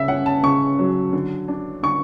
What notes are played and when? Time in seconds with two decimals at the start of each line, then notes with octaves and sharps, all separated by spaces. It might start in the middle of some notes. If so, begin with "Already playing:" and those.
Already playing: C#3 E5
0.08 C#4 F#5
0.26 A5
0.43 C#3 C#6
0.79 F#3
1.13 D3
1.48 D4
1.83 D3 C#6